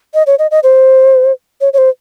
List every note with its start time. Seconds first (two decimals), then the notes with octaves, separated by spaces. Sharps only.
0.14 D#5
0.27 C#5
0.39 D#5
0.51 D#5
0.63 C5
1.61 C#5
1.73 C#5
1.78 C5